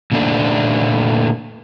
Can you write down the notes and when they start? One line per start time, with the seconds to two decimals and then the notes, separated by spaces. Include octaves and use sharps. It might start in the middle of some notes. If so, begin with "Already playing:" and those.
0.12 A#2 D3 A3 A#3 D4 D#4